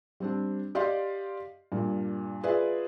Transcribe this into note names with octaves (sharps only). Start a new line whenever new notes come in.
G3 C4 D4
G4 D5 D#5 F5 C6
G2 A#2
F4 G#4 B4 D5 E5